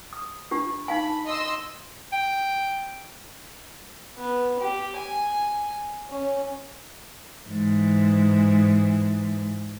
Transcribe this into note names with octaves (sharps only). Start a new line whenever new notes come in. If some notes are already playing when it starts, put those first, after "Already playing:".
D#6
D4 F4 G4
D#4 F5 G#5 B5
D#5 C6 E6
G5
B3
G4
G#5
C#4
G#2 E3